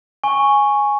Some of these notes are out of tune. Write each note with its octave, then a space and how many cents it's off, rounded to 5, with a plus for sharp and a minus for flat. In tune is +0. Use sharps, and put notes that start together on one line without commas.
G#5 +0 C#6 +0